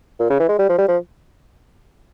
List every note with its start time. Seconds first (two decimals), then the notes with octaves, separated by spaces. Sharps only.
0.20 A#2
0.30 C#3
0.40 E3
0.49 G#3
0.59 G3
0.69 F3
0.78 G3
0.88 F3